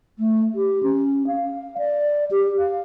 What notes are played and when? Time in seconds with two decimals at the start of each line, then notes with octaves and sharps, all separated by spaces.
0.19 A3
0.55 G4
0.83 C#4
1.27 F5
1.78 D5
2.31 G4
2.59 F5